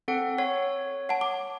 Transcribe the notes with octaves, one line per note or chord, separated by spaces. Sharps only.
C4 A4 F#5
C#5 F#5
F#5 A5
D6